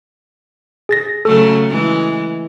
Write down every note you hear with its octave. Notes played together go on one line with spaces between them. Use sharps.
G#4 A6 A#6
C#3 F#3 A3 A4
E3 G#3